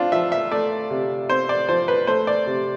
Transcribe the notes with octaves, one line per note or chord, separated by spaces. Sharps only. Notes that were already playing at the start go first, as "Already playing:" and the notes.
Already playing: C4 D4 F4
F3 E5
E5
A3 D5
C3
C4 C5
D5
F3 C5
B4
A3 C5
D5
C3